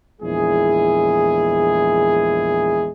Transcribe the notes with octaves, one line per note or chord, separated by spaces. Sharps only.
A#1 E2 G#3 E4 G#4